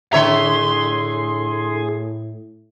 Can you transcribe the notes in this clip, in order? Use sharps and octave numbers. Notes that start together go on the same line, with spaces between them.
A2 D3 G#4 C#5 E5 A#5 C6